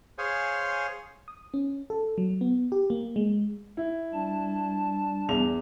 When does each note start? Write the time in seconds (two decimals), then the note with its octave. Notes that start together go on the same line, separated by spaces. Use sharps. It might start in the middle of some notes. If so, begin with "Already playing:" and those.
0.18 G#4 C5 C#5 F5 G#5
1.28 D#6
1.54 C#4
1.90 A4
2.18 F#3
2.41 B3
2.72 G4
2.90 A#3
3.16 G#3
3.77 E4
4.14 G3 D4 A5
5.28 E2 F7